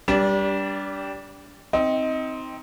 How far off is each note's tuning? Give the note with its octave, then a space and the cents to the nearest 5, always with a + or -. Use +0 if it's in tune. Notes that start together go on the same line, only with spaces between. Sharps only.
G3 +0 D4 -25 B4 -40
C4 +0 D#4 +20